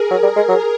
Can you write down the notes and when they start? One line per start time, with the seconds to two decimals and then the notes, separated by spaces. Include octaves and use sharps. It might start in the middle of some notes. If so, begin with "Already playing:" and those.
Already playing: G#4 A#4
0.11 F#3
0.23 G3
0.36 G#3
0.48 F#3